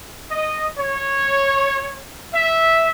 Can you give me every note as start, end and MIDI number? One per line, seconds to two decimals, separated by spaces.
0.31 0.68 75
0.77 1.99 73
2.34 2.91 76